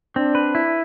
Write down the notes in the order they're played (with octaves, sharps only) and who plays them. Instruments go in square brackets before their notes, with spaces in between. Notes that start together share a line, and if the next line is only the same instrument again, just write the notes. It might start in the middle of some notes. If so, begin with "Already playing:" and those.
[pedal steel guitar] C4 [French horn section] D4
[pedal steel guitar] B4
E4